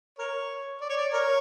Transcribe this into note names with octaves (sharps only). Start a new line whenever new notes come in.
A#4 C#5
D5
C#5
D5
A#4 C#5